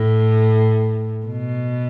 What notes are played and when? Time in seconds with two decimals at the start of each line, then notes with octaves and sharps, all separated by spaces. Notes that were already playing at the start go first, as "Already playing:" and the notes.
Already playing: A2
1.26 B2